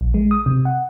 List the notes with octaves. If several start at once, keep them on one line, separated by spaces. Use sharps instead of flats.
A#1
G#3
D#6
C3
F#5